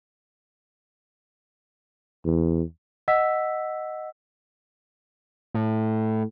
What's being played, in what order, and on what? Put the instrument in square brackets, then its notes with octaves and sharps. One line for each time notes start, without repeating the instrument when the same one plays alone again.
[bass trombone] E2
[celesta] D#5 F#5 E6 B6
[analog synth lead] A2